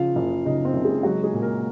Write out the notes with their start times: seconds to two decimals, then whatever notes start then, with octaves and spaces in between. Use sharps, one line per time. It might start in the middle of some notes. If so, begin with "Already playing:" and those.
Already playing: C#3 F3 F4 F5
0.16 F#1
0.46 C#3 D#4 D#5
0.65 C4 C5
0.74 F#1
0.85 G#3 G#4
1.03 F#3 G#3 F#4
1.23 G#3 G#4
1.33 A#2
1.42 A#3 A#4